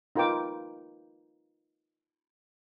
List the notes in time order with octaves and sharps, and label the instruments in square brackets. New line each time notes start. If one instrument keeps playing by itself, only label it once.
[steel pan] D#4 F4 A#4 B4 G5 D6